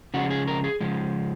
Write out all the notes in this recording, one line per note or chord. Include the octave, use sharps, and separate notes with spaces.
C#3 F3 G#3 F#4
G#4
A#4
G#4
C#3 F3 G#3